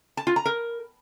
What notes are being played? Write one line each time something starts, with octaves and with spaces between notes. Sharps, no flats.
A5
F4
A#5
A#4